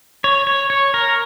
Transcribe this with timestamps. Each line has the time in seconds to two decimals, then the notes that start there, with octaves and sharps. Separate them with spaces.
0.24 C#5
0.47 C#5
0.70 C#5
0.94 A#4